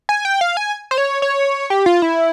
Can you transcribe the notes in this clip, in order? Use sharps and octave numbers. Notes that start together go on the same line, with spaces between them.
G#5
G5
F5
G#5
C5
C#5
C#5
G4
F4
E4